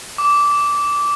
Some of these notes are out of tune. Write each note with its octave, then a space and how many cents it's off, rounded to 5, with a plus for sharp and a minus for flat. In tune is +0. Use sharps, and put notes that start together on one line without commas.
D6 -15